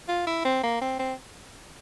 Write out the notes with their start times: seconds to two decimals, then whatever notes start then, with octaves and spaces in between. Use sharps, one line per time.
0.08 F4
0.27 E4
0.45 C4
0.63 A#3
0.82 C4
0.99 C4